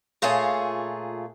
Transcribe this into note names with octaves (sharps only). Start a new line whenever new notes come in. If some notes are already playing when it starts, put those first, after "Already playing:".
A#2 A3 F4 G#4 C#5